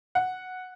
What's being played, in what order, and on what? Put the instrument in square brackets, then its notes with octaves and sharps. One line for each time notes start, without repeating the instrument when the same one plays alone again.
[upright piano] F#5